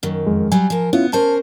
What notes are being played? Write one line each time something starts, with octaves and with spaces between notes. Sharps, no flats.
F#2 D#3
F2 G#3
F#3 G3 G#5
F3 A#4
B3 C#4 E4 F4
C#4 A#4 C5 A5